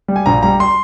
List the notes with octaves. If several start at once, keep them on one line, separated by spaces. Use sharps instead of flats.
G3
G#5
A#1 A#5
G3 A#5
C6